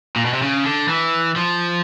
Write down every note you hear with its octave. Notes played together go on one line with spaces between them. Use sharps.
A#2
B2
C3
C#3
D3
E3
F3